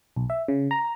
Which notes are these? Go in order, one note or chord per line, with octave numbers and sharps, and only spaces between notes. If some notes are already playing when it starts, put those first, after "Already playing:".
B1
E5
C#3
A#5